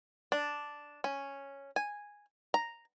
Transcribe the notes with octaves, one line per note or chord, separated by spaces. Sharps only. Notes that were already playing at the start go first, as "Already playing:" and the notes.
D4
C#4
G#5
A#5